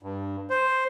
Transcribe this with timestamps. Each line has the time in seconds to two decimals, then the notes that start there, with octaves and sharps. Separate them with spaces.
0.03 G2
0.50 C5